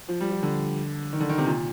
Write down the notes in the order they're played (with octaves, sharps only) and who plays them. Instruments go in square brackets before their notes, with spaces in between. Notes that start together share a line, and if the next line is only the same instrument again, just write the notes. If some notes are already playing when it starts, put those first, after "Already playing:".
[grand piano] F3
G3
F3
D3
D#3
D3
D#3
C3
A#2